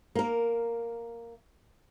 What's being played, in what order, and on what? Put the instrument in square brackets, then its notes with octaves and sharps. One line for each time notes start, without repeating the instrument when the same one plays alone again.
[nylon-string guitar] A#3 A#4